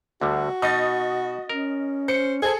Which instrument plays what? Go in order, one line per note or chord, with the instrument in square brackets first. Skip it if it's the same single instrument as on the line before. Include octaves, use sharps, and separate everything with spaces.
[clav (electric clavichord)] D2 D3 G3 [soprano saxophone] F#4
[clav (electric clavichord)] B2 D#4 [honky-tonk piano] D#5 A6
[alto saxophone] C#4 [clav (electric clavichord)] A#4
[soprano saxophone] C5 [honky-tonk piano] C#7
[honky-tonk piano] G#4 A4 [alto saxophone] C5 [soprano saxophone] G#5